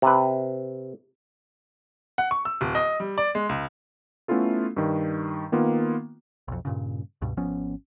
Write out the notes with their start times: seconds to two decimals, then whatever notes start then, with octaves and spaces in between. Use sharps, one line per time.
0.02 C3 B4
2.18 F#5
2.31 C#6
2.45 E6
2.61 D1
2.75 D#5
3.00 G3
3.18 D5
3.35 G#3
3.49 C#2
4.28 A3 B3 C#4 E4 F4 A4
4.76 G2 D#3
5.52 D#3 A#3 B3 F4
6.48 B1 F2
6.65 G2 A#2 C#3
7.21 C#2 G2 B2
7.37 G#1 F3 B3 C#4